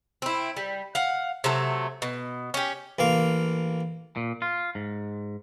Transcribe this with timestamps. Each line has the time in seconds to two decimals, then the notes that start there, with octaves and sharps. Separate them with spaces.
0.22 C4 E4
0.57 G3
0.95 F5 F#5
1.44 C3 F#3 A3
2.02 B2
2.54 C#4 G4
2.99 A1 A#3 F5
4.17 A#2
4.42 F4
4.75 G#2